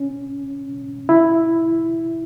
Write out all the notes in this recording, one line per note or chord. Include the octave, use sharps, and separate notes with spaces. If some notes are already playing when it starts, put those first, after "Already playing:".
Already playing: C#4
E4